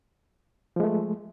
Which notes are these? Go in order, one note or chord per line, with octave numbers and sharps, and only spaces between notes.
F3 G#3 A3